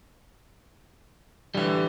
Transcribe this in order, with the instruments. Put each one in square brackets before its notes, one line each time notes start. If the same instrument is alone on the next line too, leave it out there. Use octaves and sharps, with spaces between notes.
[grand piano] A2 D3 E3 [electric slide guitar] G3